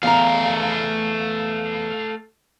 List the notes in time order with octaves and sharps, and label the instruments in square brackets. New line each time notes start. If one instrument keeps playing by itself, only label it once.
[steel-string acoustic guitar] E2 A#5 [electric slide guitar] A3 F5